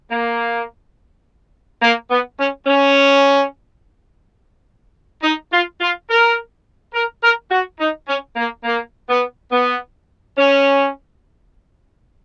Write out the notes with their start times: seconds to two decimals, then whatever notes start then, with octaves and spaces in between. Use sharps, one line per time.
0.10 A#3
1.81 A#3
2.10 B3
2.38 C#4
2.66 C#4
5.22 D#4
5.51 F4
5.80 F4
6.08 A#4
6.93 A#4
7.22 A#4
7.50 F#4
7.79 D#4
8.07 C#4
8.36 A#3
8.64 A#3
9.08 B3
9.51 B3
10.36 C#4